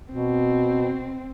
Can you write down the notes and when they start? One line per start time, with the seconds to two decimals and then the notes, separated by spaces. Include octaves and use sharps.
0.14 B2 C4